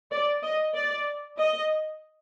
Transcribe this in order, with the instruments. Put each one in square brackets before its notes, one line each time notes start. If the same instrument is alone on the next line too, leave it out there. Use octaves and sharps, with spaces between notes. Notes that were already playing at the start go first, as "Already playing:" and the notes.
[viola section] D5
D#5
D5
D#5